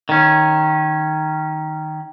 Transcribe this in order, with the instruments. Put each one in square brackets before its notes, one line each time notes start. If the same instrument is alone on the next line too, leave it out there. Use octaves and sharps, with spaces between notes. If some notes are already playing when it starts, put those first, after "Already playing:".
[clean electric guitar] D#3 C#4